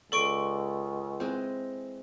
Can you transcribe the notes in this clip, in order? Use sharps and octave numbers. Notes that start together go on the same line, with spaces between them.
C#2 A4 D5 C#6 D7
E3 G#3 C4